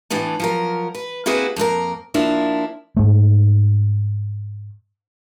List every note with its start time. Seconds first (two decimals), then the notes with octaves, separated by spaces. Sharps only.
0.10 A2 E3 B3 D4
0.40 F3 F#3 A#4
0.95 B4
1.26 A#3 C4 E4 F#4 G#4 B4
1.56 F2 A#3 F4 A#4
2.14 F3 A#3 D4 E4
2.97 G#2 A3